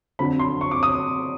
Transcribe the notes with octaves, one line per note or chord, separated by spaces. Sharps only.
F2 D3 F#3 B5
C6
C#6
D6
D#6